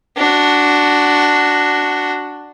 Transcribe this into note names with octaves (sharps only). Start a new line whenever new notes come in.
D4 F#4